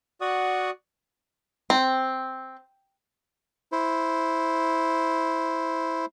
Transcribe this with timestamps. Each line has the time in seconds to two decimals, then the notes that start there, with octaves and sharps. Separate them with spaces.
0.21 F#4 D5 F#5 C#6 D#6
1.70 C4
3.72 E4 C5